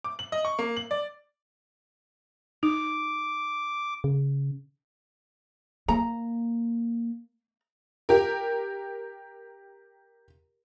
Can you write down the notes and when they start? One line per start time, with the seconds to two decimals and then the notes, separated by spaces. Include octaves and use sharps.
0.04 D6
0.19 F#7
0.32 D#5
0.45 C#6
0.59 A#3
0.77 F#7
0.91 D5
2.63 D#4 D6
4.04 C#3
5.88 A#3 A#5
8.09 G4 A#4